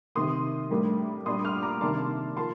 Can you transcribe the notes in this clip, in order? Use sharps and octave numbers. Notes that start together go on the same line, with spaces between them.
C3 D#3 A#3 C6 D#6
A2 G3 A#3 D4
A#2 G3 D4 C6 D#6
D6 F6
A#5 D6
C3 D#3 A#3 D4 A5 C6
F3 A#3 A5 C6